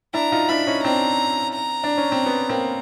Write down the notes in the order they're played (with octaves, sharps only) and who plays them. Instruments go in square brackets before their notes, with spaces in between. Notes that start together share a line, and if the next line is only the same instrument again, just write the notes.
[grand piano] D4 E4 [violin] A#5
[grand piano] D#4 F4
[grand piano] D4 E4 [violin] B5
[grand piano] C#4 D#4
[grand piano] C4 D4 [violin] A#5
[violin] A#5
[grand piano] D4
C#4
C4
B3
A#3 C4